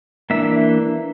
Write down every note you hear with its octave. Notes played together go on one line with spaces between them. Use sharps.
E3 A#3 D4 E5